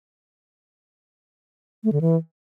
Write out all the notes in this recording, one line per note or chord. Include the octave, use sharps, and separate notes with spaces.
A3
D3
E3